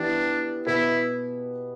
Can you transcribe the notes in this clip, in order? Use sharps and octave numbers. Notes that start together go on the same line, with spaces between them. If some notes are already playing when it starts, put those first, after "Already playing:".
Already playing: E3 B3 D4 G4
B2 B3 E4 G4 B4